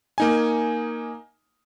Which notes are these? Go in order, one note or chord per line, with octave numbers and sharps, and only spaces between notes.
A#3 D#4 G#5